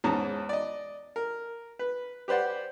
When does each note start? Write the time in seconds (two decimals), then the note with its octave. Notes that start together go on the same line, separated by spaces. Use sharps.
0.04 E2 G#2 C#4 A5 A#5
0.49 D5 D#5
1.16 A#4
1.79 B4
2.28 G4 B4 C5 D5 F#5